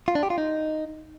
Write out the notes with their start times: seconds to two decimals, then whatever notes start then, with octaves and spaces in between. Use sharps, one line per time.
0.08 F4
0.15 D4
0.23 G4
0.30 F4
0.38 D#4